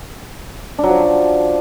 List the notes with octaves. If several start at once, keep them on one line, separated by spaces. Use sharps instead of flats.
D4
F#3
F3